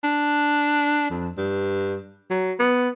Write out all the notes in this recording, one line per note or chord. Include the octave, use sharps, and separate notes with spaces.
D4
F2
G2
F#3
B3